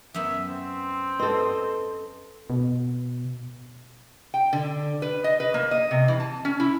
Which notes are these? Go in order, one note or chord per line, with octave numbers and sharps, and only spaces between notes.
F#2 B3 E5
C4
A4 B4 D#5 C6
B2
G5
D3
B4
D#5
B4
A#3
D#5
C3
E3
A5
C#4
E4